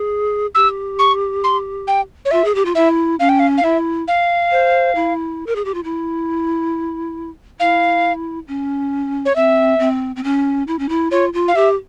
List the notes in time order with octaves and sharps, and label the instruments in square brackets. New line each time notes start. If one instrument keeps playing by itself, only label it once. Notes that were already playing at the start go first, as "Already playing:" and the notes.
Already playing: [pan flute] G#4
[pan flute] G4 [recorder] E6
[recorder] C#6
C6
G5
C#5
[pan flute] F4 [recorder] E5
[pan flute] G#4
G4
F4
[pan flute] E4 [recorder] E5
[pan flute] C#4 [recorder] F5
[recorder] G5
F5
F5
[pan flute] E4 [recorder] E5
[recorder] F5
[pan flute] C5
E4
A#4
G#4
G4
F4
E4
[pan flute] E4 [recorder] F5
[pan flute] C#4
[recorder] C#5
[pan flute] C4 [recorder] E5
[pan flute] C4
C4
C#4
E4
C#4
E4
[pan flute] F4 [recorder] C#5
[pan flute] F4
[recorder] F5
[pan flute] G4 [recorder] E5